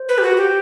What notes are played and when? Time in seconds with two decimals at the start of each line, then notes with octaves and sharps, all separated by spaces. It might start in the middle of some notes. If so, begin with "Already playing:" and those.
Already playing: C5
0.09 B4
0.18 G4
0.23 F#4
0.37 G4